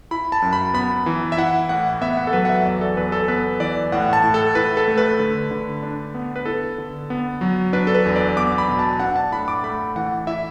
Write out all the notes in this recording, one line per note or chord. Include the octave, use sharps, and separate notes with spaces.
E4 B5
A5
F#2
B5
B3 B5
E3
E5
E4 F#5
A2 F#5
B3 E5
F#5
A4
F#3 B4
F#5
E5
E2 D5
A4
E2 B4
A4
B3 B4
E3 D5
A2 F#5
A5
A2
A4
E4 B4
A4
A3
B4
D3
D3
D4
B3
B4
E4 A4
D3
B3
F#3
D4 B4
A4
B4
E2
D5
B3 D6
B5
B2
A5
D4 F#5
A5
A2 B5
D6
A3 B5
E3 F#5
E4 E5